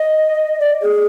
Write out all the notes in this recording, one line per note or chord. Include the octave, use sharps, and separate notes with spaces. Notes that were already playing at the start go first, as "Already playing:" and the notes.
Already playing: D#5
D5
G#4